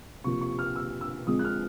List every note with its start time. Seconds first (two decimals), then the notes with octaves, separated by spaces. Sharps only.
0.24 C3 F3 A#3 C#6
0.41 C#6
0.59 F6
0.76 E6
1.01 E6
1.27 F3 G#3 C4 D#6
1.39 F#6
1.45 F6